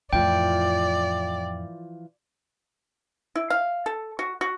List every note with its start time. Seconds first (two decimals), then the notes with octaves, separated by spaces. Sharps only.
0.13 F2 A2 E3 F3 F4 D5 G5
3.35 E4
3.50 F5
3.86 A4
4.19 F#4
4.41 F#4